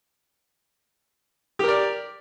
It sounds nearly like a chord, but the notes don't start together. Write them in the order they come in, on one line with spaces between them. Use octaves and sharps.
G4 A#4 D5